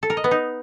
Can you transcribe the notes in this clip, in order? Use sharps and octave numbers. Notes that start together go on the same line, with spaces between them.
A4
A#4
D#5
B3
D#4